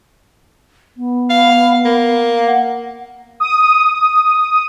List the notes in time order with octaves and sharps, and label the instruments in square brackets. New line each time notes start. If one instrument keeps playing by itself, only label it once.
[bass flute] B3
[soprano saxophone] F5
A#3
[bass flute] F#5
[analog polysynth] D#6